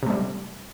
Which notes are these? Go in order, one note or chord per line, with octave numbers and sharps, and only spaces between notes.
C3 G3 A3